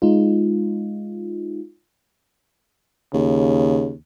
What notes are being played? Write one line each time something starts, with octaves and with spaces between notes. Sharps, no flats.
G#3 D#4 F4
D#2 C#3